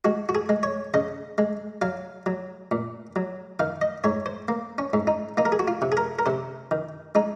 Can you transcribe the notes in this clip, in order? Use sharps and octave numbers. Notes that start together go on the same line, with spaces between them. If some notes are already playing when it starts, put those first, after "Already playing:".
G#3 F#4
F#4
G#4
G#3
C#5
C#3 D#5
G#3
F#3 F5
F#3
A#2
F#3
D#3 F5
D#5
G#2 C#5
C5
A#3
C#4
G#2
D#4
A#3 D#4
A#4
G#4
F#4
F4
C3
G#4
A#4
A#4
C3 C5
D#3
G#3 D#4